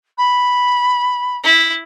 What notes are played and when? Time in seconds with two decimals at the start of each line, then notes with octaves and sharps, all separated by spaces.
0.18 B5
1.44 E4